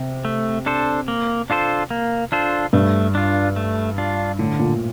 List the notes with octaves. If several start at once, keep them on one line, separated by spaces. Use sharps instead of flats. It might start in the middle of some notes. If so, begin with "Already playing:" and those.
Already playing: C3
A3
D4 A4 C5
A#3
D4 F4 A4 C5
A#3
D4 F4 A4 C5
G2 A3
D4 F4
A3
D4 F4
A2 D3
A#2